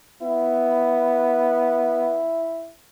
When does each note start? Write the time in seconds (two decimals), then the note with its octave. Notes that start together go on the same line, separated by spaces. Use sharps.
0.22 B3 E4